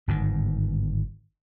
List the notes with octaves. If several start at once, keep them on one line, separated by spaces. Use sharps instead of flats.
G1 G#2 D#3